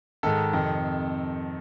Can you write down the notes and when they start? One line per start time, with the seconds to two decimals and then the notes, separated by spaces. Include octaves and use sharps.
0.23 G#2 D#3 A4
0.53 F2 C3 D#3